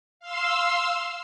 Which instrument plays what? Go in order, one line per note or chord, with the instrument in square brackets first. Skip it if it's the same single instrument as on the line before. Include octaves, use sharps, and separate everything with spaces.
[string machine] F5 C6 E6